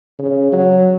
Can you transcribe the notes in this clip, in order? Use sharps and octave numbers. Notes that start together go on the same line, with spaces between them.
C#3
F#3